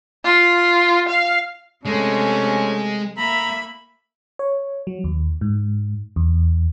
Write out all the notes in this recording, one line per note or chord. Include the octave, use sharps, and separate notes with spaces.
F4
F5
C3 G#3 A3 C#4
A#3 E5 A#5 B5
C#5
F#3
D#2
G#2
E2